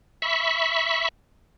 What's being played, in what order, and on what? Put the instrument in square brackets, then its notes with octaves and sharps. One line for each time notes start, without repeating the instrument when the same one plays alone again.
[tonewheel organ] E5 B5 C#6